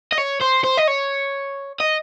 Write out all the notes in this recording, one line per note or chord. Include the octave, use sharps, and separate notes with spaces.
D#5
C#5
C5
C5
D#5
C#5
D#5